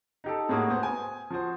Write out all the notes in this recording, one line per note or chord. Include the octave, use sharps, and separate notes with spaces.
D#4 G4 A4
A2 G#3 A#3 F#4 D#6
B3 C5
G#5
F3 F#4 C5